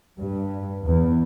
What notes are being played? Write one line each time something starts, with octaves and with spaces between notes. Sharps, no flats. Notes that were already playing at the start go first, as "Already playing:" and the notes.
G2
E2